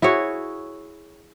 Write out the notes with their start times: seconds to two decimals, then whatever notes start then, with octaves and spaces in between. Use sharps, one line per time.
0.02 E4 F#4 G#4 C#5